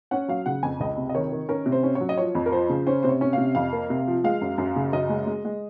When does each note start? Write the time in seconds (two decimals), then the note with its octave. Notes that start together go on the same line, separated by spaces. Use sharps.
0.11 C#4 F#5
0.28 F#3 F5
0.46 C#3 F#5
0.63 F2 G#5
0.80 C#2 D#5
0.98 C3
1.09 D#5
1.15 D#3 C#5
1.32 D#3
1.49 C#4 A#4
1.66 C3
1.72 C5
1.83 C#4
1.95 C#5
2.01 F#3
2.09 D#5
2.18 F3 C#5
2.35 F2
2.46 A#4
2.52 F3 C5
2.70 C#3
2.87 C#4 C5
3.03 C3 C5
3.09 C#5
3.21 C#4
3.33 C3 F5
3.55 F2 F5
3.72 A#3
3.90 C3
4.07 F3
4.24 G#3 F5
4.41 F#2
4.58 F#2
4.76 C#3
4.93 F#2 D#5
5.09 G#3
5.27 G#3
5.45 G#3